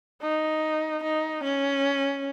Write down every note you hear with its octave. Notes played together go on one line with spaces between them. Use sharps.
D#4
D#4
C#4